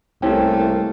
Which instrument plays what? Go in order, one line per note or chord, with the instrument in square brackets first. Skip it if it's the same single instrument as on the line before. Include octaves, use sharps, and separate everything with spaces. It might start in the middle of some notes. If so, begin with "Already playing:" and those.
[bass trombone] C2 [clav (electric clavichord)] C3 C#4 [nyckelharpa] A3 A#3 [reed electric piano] E4 G5